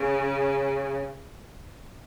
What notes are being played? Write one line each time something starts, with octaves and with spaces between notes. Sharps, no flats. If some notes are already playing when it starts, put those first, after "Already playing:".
Already playing: C#3